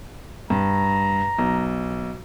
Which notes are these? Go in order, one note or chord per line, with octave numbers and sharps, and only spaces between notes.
G2 A#5
B1